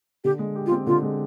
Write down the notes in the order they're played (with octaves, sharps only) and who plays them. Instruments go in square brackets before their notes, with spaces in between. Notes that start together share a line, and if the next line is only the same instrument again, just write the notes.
[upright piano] D3 [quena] G4
[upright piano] G#3
G4
[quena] F4
[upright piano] C4
[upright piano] D3 [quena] F4
[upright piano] G#3